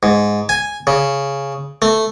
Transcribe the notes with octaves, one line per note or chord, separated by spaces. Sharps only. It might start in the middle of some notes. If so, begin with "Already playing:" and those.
G#2
G#5
C#3
A3